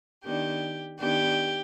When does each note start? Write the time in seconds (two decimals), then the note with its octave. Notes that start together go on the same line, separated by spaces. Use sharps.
0.25 D#3 B3 D4 G4
0.99 D#3 B3 D4 G4